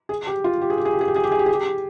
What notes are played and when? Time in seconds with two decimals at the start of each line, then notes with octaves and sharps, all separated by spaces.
0.09 G#4
0.27 G4
0.44 F4
0.61 G4
0.70 G#4
0.78 G4
0.85 G#4
0.93 G4
1.01 G#4
1.08 G4
1.16 G#4
1.24 G4
1.31 G#4
1.39 G4
1.46 G#4
1.54 G4